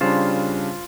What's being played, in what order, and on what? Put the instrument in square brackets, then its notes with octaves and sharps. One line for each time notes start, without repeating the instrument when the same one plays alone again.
[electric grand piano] C#3 G3 D4 [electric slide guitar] F4 C5